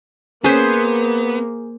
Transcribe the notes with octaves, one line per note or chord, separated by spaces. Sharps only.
A#3 B3 C#4 G#4 C5 B6